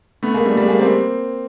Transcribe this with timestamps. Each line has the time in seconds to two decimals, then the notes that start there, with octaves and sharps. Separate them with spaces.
0.23 A3 B3
0.34 G#3 A#3
0.45 G3 A3
0.57 G3 A3
0.68 G#3 A#3
0.79 A#3 C4